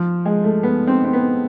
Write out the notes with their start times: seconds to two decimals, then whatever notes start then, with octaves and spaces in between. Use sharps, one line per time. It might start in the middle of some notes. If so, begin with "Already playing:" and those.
Already playing: F3
0.25 G#3
0.44 A3
0.63 B3
0.87 C4
1.04 C4
1.13 B3